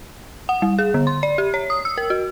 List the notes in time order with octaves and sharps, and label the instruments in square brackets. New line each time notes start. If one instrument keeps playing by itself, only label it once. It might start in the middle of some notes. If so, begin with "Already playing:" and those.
[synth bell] F#5
G3
G#4
D3
C6
D5
G4
C#5
D#6
E6
A#4
F#4